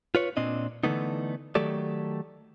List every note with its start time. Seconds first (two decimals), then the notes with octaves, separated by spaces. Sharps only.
0.15 F4 B4 C#5
0.37 A#2 C4 D4 D#5
0.84 D3 E3 A3 B3 D#4
1.55 D#3 F#3 A3 G4 A4 D5